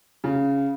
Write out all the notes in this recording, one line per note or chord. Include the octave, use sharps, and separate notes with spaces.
C#3